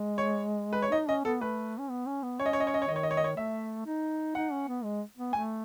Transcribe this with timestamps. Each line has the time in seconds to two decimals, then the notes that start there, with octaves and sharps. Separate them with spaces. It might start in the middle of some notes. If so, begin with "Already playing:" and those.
Already playing: G#3
0.18 C#5
0.73 B4
0.82 C#5
0.92 D#4 D#5
1.08 C#4 D#5
1.24 B3 A4
1.41 A3 B4
1.78 C#4
1.90 B3
2.06 C#4
2.23 B3
2.40 C#4 C#5
2.46 D#5
2.53 C#5
2.60 D#5
2.67 C#5
2.74 D#5
2.82 C#5
2.88 D#3 D#5
2.96 C#5
3.03 D#5
3.11 C#5
3.17 D#5
3.24 C#5
3.37 A3 E5
3.86 D#4
4.35 D#4 F#5
4.52 C#4
4.68 B3
4.84 G#3
5.17 B3
5.33 A3 G#5